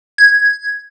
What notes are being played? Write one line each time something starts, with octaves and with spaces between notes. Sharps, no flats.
G#6